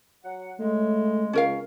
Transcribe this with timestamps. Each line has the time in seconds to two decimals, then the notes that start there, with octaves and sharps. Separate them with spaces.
0.24 F#3 F#5
0.60 C#3 G#3 A3
1.33 C#2 C#4 A#4 F5